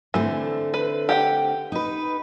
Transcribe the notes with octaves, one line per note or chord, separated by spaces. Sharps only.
D3 E3 A3 C4
B4
G4 F#5 G5
D#4 B4